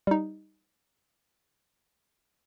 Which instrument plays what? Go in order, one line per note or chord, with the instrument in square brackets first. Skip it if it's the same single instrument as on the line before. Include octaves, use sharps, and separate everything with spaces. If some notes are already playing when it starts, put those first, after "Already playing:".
[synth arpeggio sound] G3 D#4